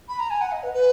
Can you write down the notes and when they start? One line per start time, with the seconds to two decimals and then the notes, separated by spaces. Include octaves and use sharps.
0.08 B5
0.19 A#5
0.30 G#5
0.41 F#5
0.52 D#5
0.63 B4
0.73 B4